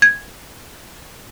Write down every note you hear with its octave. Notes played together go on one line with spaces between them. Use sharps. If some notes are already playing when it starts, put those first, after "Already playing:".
G#6